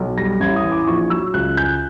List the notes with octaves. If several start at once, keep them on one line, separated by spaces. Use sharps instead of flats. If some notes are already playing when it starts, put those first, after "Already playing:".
Already playing: B1
G3 A#6
A1 G#6
D#6
E3
D6
A#1 C#6
F#3 E6
C#2 F#6
G#3 G6